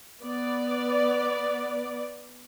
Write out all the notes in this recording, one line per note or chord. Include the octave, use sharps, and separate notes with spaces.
B3 D5